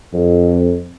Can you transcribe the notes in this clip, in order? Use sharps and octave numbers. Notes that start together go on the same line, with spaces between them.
F2